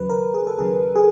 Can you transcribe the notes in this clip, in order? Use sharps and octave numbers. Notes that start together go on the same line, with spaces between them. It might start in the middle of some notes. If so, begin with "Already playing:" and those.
Already playing: D#2 C#3 F#3 B4
A#4
G#4
A4
D#2 C#3 F#3 G#4
G#4